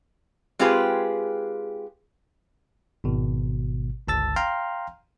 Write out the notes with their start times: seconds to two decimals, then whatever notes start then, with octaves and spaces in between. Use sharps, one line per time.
0.59 G#3 C4 F4 G4 G#4 B4
3.04 G#1 B2
4.07 G1 C#2 A5 E6 A6
4.36 F5 G5 A#5 C6 F6